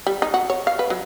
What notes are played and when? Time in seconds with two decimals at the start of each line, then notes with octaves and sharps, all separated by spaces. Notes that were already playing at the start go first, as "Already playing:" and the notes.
0.07 G3
0.22 D#4
0.34 F#4
0.50 C#5
0.67 F5
0.79 B4
0.90 F#3